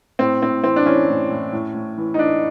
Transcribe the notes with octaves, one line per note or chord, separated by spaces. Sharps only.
A2 C4
A2 C4
E3 C4
D4
E3 C#4
A2
A2
A2
A2
E3
D#4
E3 D4